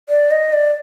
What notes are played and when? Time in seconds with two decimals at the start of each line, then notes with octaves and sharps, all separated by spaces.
0.09 D5
0.31 D#5
0.53 D5